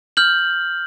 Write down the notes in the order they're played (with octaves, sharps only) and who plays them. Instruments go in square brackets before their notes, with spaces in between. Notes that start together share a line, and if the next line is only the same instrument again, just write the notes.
[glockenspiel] F6 G6 F#7